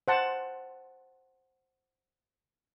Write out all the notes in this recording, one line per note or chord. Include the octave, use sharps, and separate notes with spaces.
C5 F#5 A5